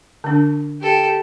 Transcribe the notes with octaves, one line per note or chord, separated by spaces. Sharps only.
D3 D4
G4 A4